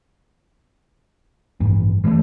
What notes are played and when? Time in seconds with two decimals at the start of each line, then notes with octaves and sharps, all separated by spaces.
1.60 A1 G2
2.04 E3 F3 G#3 A3